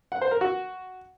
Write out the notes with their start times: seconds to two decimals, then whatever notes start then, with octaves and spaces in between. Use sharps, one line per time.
0.12 F#5
0.22 C5
0.31 A#4
0.41 F#4